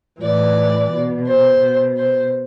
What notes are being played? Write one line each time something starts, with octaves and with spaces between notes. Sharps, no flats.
A2 E3 D5
B2
C5
B2
C5